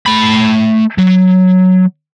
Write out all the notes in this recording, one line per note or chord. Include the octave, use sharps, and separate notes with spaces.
A3 B5
F#3